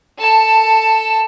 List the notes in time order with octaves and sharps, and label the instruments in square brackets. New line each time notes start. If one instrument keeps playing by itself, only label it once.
[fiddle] A4 A5